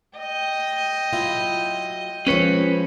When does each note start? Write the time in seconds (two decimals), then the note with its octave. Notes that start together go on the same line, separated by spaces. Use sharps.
0.18 D#5 G5
1.13 F#3 E4 F4
2.27 F3 G#3 C#4 B4 C#5